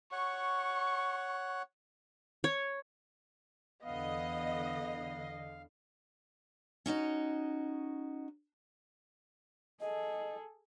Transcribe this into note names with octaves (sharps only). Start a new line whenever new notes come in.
C#5 F#5 C#6
C#5
E2 D3 B3 D#5 F5
C#4 D#4 F#4 D#5
G#4 A4 D#5